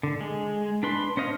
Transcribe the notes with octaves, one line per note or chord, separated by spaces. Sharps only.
D3
G#3
D4 B4 C6
C#4 C5 D#5 F5